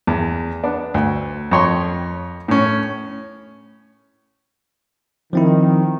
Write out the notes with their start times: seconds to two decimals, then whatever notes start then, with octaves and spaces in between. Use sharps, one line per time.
0.07 E2
0.64 B3 D4
0.94 D2
1.51 F2 C#5 C6
2.48 A2 C#4
5.33 D#3 F3 C4 E4